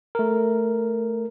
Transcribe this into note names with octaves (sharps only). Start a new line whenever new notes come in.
A3 A#4